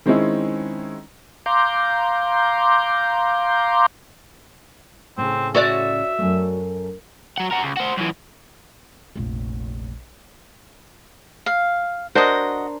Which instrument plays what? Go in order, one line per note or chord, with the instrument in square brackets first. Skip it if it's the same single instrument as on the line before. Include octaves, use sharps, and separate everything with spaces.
[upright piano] D#3 G#3 C4 C#4 E4
[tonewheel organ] F5 A#5 C6 D6 G6
[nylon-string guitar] A2 C#3 [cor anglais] C4
[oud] F#4 C#5 D5 [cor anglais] E5
[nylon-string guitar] F#2 A3
[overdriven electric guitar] F#3 F#5
F#4 A#4
C#2
F#4 C5
F#2 E3
[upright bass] F1 A#1
[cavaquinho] F5
[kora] D4 A#4 C5 [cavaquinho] F#4 D#5